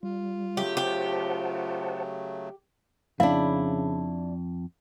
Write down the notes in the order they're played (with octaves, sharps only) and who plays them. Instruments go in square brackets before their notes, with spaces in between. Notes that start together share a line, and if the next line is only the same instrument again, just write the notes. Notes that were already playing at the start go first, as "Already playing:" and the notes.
[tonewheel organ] G3 [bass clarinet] F4
[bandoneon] C#3 F#3 A3 [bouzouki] G4
[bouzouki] G4 [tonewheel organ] C5 F#5 A5
[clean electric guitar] F2 [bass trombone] C#3 [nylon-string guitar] D4 E4 [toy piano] F5